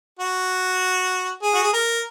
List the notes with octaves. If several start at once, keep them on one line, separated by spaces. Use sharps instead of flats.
F#4
G#4
F#4
G#4
A#4